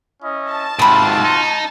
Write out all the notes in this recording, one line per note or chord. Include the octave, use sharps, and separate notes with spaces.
C#4 E4 D#5
A5
G#2 C3 C4 F4 F#4 B5 D#6
D#4